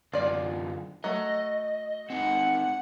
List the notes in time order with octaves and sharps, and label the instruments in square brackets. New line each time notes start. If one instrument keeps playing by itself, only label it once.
[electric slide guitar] F#2 D3 [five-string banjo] F4 D5
[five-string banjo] F#3 A3 [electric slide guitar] D#5
[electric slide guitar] C4 D#4 [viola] F#5